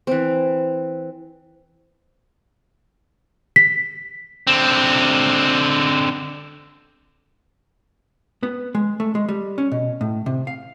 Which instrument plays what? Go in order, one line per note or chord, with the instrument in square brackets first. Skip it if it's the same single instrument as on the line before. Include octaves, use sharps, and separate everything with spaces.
[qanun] E3 C4
[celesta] B6
[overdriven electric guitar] D3 C4
[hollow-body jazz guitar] B3
G#3
A3
G#3
G3
C#4
B2
A2
C3
F5